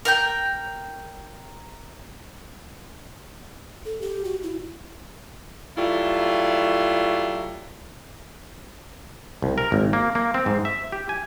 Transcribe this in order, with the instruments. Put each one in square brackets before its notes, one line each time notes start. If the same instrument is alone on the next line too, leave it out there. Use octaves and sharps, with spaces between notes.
[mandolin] A#4 G5 G6
[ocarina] A4
G4
F#4
E4
[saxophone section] F#3 G3 A3 E4 F4
[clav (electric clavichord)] C2
A#4
G#1
A#3
A#3
C4
G#2
E5
G4
G#5